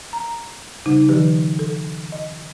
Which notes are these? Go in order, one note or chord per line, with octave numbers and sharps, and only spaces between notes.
A#5
C#3 G3 D#4
D#3 F3 G4 B4
A4
D#5